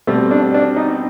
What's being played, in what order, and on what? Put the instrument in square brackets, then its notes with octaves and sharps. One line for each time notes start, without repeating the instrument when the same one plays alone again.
[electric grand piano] B2 G3 C4 [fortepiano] A3
[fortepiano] D4
D4
D#4